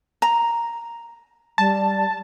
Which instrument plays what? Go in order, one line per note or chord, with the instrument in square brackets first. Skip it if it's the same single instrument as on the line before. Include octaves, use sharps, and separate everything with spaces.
[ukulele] A#5
[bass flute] G3 [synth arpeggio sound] A5